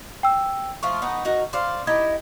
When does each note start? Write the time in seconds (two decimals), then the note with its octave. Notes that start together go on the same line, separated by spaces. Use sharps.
0.23 G5 E6
0.83 F3 A3 F4 C#6
1.02 B3 D#4
1.25 D#4 F#4 A#4
1.53 C5 D5 F5
1.87 D#4 E4 G4 G#6